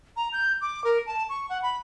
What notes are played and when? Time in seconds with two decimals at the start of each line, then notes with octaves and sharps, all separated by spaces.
0.17 A#5
0.33 G6
0.61 D6
0.84 A#4
1.07 A5
1.29 C#6
1.49 F#5
1.62 B5